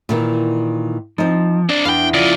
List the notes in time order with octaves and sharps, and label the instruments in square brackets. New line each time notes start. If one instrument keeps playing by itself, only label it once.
[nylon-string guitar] A#2 D#3 E3
[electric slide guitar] F3 [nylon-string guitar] C4 D#4
[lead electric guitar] C4 D5 [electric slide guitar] D4
[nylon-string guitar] E2 [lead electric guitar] F5 G5
[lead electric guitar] C#3 F3 [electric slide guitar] F4 D5